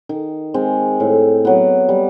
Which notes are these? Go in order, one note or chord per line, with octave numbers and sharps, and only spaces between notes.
D#3
G#3 C4
A2
F#3 B3
G3